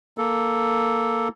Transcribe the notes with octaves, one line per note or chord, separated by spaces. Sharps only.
A#3 A4